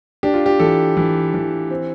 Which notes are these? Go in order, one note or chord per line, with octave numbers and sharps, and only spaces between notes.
D4 G4
F4
G4
E3 A4
E3
E3
C4